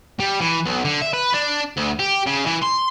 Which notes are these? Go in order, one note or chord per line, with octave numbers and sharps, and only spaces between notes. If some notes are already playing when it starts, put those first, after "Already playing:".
G3
E3
B1
D3
E5
B4
D4
D2
G4
C#3
E3
C6